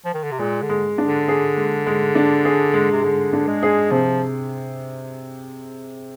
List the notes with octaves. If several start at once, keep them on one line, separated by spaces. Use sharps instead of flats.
F3
D#3
D3
C3
A#2 G#3
D3
G#3
D4
D3
G#4
G#3
G#3
D4
G#4
G#3
C3
D3 G#3
D4
G#3
G#4
C3 F3